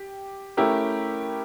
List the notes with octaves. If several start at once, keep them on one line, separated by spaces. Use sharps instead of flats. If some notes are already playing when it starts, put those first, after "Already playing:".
Already playing: G4
A3 C#4 E4 G4 A#4